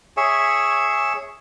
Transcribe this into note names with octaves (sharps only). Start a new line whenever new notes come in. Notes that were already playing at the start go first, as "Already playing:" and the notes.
G#4 C#5 E5